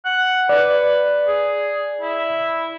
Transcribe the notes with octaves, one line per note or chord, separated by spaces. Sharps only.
F#5
B4 D5
G#4
E4